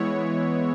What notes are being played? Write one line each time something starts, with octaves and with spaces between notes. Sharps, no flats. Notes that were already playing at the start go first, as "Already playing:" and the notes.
Already playing: E3 G#3 B3 E4 C#5